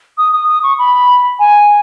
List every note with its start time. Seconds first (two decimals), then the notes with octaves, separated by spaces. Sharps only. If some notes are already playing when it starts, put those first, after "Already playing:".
0.18 D#6
0.33 D#6
0.48 D#6
0.63 C#6
0.79 B5
1.39 G#5